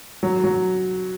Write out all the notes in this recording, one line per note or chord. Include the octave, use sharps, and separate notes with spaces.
F#3
F#3